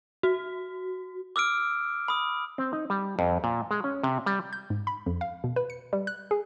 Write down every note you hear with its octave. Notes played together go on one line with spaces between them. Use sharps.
F#4
D6 E6 F6 D7
B5 D#6
C4
D#4
G3
F2
A#2
G#3
C#4
C3
G3
G6
G#2
B5
F2
F5
B2
B4
C#7
G3
F#6
G#4